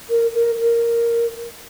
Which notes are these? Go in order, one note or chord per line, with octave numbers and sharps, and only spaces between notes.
A#4
A#4
A#4